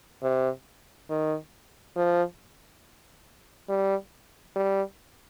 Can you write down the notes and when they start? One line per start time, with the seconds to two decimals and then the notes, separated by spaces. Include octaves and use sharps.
0.23 C3
1.10 D#3
1.96 F3
3.69 G3
4.56 G3